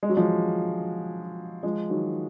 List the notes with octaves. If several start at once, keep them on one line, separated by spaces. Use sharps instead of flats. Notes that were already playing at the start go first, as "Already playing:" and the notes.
G#3
F#3
F3 G#3
F3 G#3
D#3 F#3